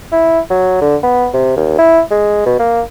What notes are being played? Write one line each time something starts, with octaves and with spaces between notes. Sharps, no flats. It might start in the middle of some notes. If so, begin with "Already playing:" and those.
E4
F#3
D3
B3
C3
D#2
E4
G#3
B2
A#3